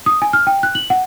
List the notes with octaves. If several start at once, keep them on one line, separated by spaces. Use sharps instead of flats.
D#6
G#5
F6
G5
F#6
F#7
F#5